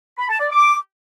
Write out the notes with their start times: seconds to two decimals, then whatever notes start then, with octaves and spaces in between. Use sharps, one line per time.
0.18 B5
0.29 A5
0.40 D5
0.51 D6